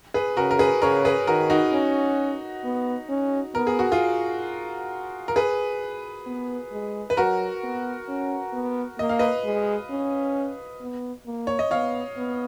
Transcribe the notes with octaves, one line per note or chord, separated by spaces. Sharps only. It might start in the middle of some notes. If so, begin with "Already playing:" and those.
G#4 B4
C#3 F#4 A#4
A#4
G#4 B4
C#3 A#4 C#5
G#4 B4
D#3 F#4 A#4
D#4 F#4
C#4
B3
C#4
B3 A#4
G#4
F#4
F4 G#4
A#4
G#4 B4
B3
G#3
B4
F#3 F#4 A#4
B3
C#4
B3
A#3 D#5
F5
B4 D#5
G#3
C#4
B3
A#3
C#5
D#5
B3 C#5 F5
B3